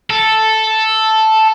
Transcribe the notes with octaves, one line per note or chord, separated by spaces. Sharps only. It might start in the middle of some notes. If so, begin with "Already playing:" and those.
A4